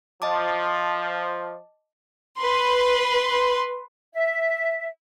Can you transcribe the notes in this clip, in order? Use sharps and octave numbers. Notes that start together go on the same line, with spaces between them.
F3 D#5 A5 D6
B4 C6
E5